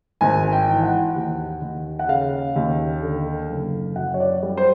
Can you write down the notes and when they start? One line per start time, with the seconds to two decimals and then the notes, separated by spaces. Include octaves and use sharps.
0.21 G#1 G#5
0.53 G5
0.68 E3
0.83 F#5
1.15 D#2
1.61 D#2
1.99 F#5
2.08 C#3 F5
2.56 D#2
3.02 D3
3.50 F#1
3.96 F#2 F#5
4.14 C#5
4.20 D5
4.43 G3
4.57 C5